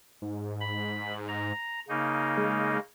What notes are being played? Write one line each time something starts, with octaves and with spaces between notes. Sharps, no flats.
G#2
B5
A#5
C#3 A#3 D#4
G#3